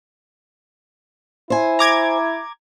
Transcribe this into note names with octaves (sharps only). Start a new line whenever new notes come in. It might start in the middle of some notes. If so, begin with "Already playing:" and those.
E4 C5 G#5
A#5 D6 G#6